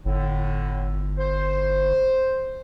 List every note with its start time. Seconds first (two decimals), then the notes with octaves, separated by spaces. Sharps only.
0.05 G1 A2 D3
1.18 C5